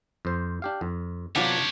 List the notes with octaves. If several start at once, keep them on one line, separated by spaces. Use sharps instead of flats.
F2 C5
D4 G4 F5
F2
C3 F#3 B3 D4 F4 G4 C#5